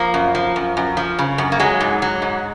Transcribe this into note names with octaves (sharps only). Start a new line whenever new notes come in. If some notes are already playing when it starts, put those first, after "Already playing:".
Already playing: F3 A#3
F#2
F3
F#2
F#2
F3
C#3
F#2
A#3
F#3 G#3
G#2
F#3
G#2